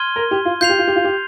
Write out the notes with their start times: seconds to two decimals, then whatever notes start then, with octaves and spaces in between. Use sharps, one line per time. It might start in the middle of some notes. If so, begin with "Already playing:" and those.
Already playing: C6 F6 G#6 D#7 G7
0.16 A#4
0.31 G4
0.45 F4
0.61 F4 G6 C7 F7
0.69 G4
0.79 F4
0.88 G4
0.96 F4
1.04 G4